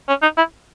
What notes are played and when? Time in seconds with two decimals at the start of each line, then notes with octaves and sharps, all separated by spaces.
0.08 C#4
0.22 D#4
0.37 E4